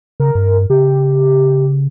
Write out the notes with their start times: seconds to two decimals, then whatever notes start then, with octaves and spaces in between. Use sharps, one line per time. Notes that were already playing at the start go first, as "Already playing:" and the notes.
0.20 C#3 A#4
0.35 G2
0.70 C#3 G4